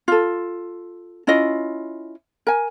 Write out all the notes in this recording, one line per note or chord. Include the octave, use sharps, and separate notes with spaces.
F4 A4
C#4 E4 F4 D#5
A#4 G#5